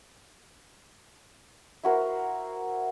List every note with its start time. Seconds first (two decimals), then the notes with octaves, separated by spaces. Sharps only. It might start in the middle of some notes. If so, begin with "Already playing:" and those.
1.83 E4 F#4 A#4 C5